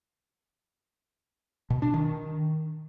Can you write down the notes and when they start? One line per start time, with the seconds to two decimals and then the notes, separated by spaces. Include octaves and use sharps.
1.70 B2
1.82 D4
1.94 D#3